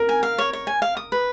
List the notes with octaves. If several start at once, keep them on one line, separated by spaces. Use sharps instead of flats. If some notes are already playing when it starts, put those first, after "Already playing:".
Already playing: A#4
G#5
F5
C#5
C#5
G#5
F5
D#6
B4